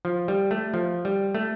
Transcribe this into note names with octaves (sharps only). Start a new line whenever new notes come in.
F3
G3
A3
F3
G3
A3